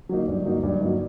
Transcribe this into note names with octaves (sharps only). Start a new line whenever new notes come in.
F#3 A#3 D#4
G2
F#3 A#3 D#4
G2
F#3 A#3 D#4